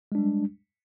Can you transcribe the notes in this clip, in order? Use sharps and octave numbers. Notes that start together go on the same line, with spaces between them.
G3 G#3 D4